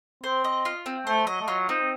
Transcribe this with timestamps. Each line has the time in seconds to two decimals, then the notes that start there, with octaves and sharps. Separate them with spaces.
0.23 C4 C5
0.44 D#5
0.65 F4
0.86 C4
1.07 A3 C5
1.27 F#3 D#5
1.41 A3
1.48 F#3 F4
1.69 C4 D#4